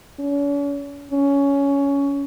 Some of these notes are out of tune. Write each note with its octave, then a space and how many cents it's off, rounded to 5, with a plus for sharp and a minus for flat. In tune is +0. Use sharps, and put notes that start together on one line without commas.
C#4 +45
C#4 +15